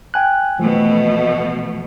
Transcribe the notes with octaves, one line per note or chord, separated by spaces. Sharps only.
G5 G#5 F#6
B2 E3 F3 A3